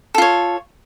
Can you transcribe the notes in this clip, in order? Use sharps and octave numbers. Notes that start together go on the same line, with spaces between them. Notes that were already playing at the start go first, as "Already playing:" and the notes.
F4 A4 C#5